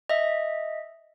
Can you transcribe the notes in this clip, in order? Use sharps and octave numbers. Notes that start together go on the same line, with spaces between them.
D#5 E5